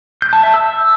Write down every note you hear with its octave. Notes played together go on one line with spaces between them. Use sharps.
G6
A5
E5
E6